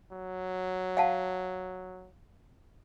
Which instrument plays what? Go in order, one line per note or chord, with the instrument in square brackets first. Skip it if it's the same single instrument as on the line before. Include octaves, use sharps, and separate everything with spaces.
[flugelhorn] F#3
[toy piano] F5 F#5 A5